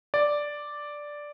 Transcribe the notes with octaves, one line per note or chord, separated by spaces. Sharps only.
D5